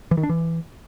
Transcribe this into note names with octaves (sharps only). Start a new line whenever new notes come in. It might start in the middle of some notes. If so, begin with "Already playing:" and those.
E3
D#3
D4
E3